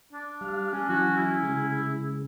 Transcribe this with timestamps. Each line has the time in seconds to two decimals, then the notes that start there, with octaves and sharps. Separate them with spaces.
0.13 D4
0.41 G3 F5
0.72 C#4
0.89 E3 F#3 F#4
1.17 E4
1.43 C#3 G#3